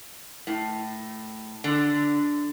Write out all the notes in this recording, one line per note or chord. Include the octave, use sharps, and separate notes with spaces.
A2
D3